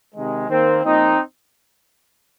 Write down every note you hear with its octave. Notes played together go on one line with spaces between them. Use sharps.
C3 D#3 G#3
D#3 A#3 C4
A#2 F3 A#3 C4 D#4